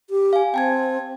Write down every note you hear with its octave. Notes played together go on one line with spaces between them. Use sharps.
G4
F5 G#5
C4 G5 A5 G#6